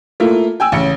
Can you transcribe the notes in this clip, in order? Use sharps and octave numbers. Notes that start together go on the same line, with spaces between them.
A3 A#3 E4 F4
G5 G#5 E6
A1 C#3 C#7